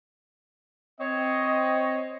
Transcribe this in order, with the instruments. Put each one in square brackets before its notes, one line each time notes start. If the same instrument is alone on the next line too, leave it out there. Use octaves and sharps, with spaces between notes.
[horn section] C4 C#5 D#5